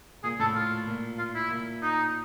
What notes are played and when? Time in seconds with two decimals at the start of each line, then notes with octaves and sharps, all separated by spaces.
0.24 A#2 G#4
0.40 A2 A4
0.55 F4
0.87 A#2
1.19 F4
1.35 E4
1.50 A#2
1.82 D#4